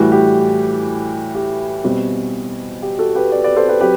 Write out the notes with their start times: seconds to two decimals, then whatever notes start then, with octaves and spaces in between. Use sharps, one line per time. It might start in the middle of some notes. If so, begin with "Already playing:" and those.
Already playing: A2 E3 G3 F#4
0.12 G4
1.35 G4
1.84 B2 G3 C4 F#4
2.82 G4
2.99 F#4 A4
3.15 G4 B4
3.31 B4 D5
3.44 B4 D5
3.56 A4 C5
3.68 G4 B4
3.80 F#3 C4 G4 B4